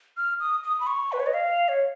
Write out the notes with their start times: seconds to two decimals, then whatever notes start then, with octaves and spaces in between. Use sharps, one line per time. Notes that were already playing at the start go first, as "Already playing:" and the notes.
0.17 F6
0.40 D#6
0.63 D#6
0.80 B5
0.87 C#6
1.12 B4
1.20 C#5
1.27 D#5
1.34 F5
1.69 C#5